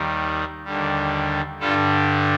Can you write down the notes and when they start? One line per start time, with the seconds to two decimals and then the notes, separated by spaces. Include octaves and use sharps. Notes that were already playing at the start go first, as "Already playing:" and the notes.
Already playing: D#2 D#3 G3
0.64 D#2 D3 G3
1.60 G2 D3 G3 F4 A4